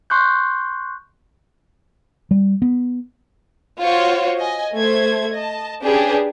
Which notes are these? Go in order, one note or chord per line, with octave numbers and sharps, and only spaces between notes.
C6 C#6 F#6 G6
G3
B3
F4 F#4 C5 C#5
D#5 G#5
A3 C5 G#6
D#5 A5
C#4 D4 G4 G#4 B4 G5